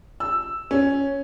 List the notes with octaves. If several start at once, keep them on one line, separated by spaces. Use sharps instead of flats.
E6
C#4